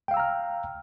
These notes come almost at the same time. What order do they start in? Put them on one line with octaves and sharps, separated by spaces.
G5 F5 E6 A#5 F6